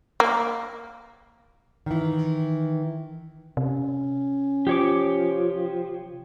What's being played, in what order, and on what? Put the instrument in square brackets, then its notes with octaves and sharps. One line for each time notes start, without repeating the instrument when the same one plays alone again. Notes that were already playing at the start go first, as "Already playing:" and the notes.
[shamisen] A#3
[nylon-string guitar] D#3 E3
[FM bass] C3 [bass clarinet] C#4
[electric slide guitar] F3 [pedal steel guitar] G4 C#5 D6